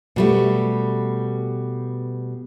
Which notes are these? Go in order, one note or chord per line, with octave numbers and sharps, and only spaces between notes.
B2 G3 A3